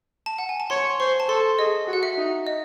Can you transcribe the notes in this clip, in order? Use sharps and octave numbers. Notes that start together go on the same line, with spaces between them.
A5
F#5
G#5
A5
C#5 C6
C5 C#6
A5
A4 C6
G#4 D#5
F#4
F#5
E5
D#4
D#5